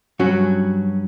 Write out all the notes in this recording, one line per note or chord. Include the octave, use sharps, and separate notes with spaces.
G2 F#3 C#4 F#4